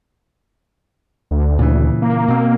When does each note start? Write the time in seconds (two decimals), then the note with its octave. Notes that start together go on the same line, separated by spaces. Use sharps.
1.31 D2
1.59 A#2 C#3 E3
2.02 A#3
2.28 B2 C4